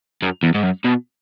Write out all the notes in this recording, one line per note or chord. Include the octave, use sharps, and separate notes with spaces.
F#2
E2
G#2
F#2
B2